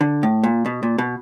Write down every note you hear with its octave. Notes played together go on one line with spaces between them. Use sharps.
D3
A2
A#2
B2
A#2
B2